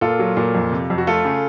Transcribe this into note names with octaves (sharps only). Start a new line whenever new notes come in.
A#2 F4 A4
F#3
A#2
F2
C3
F2
F#4
A3 F4 A4
C#3